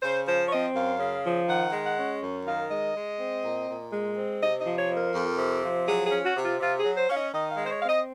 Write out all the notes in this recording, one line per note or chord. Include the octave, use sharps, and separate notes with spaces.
C#3 C5
F3 C5
C#5
C4 D#5
F#2 F5
C#3
F3
D#3 F#5
G#3
F#5
C#4
F#2
D#3 F5
G#3 D#5
G#3
C4
A#2
A#2
G#3
C4
C3 D#5
D#5
F3
C#5
F2
A#4
F2
C3
F3
F#3 G#4
G#4
C#4
F#4
C3
F4
C3 F4
G#4
F#3
C5
C#4 F5
D#5
D#3 D#5
F5
G#3
C5
C#5
C4 F5
D#5